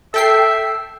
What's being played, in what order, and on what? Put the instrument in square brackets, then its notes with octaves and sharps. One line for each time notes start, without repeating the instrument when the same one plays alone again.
[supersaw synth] A4 G5 C7 [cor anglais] E5